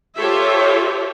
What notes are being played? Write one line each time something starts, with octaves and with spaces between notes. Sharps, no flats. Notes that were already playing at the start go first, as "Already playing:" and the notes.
F4 G4 A4 C5 C#5 E5